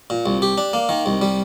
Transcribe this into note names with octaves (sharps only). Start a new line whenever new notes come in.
A#2
C2
G4
D4
A#3
D#3
C2
G3